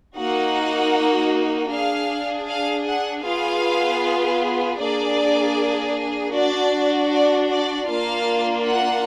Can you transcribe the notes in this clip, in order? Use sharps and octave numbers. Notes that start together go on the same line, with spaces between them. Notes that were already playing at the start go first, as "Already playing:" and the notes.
A#3 D#4 F#4 F#5
D4 G#4 F5
F5
F#5
B3 F4 G#4 F5
A#3 D4 G#4 D5
D4 F#4 D5
D5
D5
A#3 D4 F4 F5
F#5